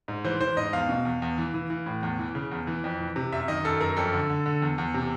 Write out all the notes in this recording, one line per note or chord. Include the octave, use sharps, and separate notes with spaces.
G#2
E3 C5
E3 C5
G#2 D#5
E2 F5
B2
E2
E2
E3
E3
E3
A2
E2
E3
C#3
E2
E3
F2
E3
C3
F#2 E5
D#3 D#5
F#2 A4
F#2 A#4
F2 A4
D3
D3
D3
E2
E2
C3